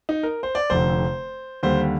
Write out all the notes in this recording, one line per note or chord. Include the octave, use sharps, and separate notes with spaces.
D#4
A#4
C5
D5
F1 F2 D3 C5
D#2 D3 G3 C5